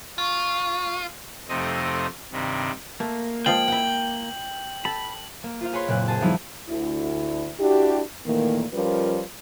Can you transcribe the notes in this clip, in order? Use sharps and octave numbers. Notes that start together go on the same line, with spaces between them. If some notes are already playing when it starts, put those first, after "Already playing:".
F4 C#6
F2 C3 A3 C4 D#4 D#5
G2 C3 D#3
A3 A#3
F3 G#3 F4 G5 F#7
E4 F#5
A4 B5
A#3
F4 C5 F5
G#4 B4 C#5 C6
F#1 A#2 C4 F#6
G#4 C5 A5
D#3 F3 G3 B3 D#4 E4
D2 E4
D4 E4 F#4 G4
A#2 D#3 E3 A3 A#3
F3 G3 C#4 F4 A#4 B4